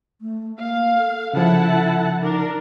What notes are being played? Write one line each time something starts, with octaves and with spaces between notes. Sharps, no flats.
A3
A#3 F5
A4
C#3 F3 E4 F#5 A5
D4 D#4 A#4